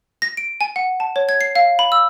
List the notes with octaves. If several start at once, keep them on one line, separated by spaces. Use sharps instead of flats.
A#6
D7
G#5
F#5
A5
C#5
G#6
C7
F5
B5
E6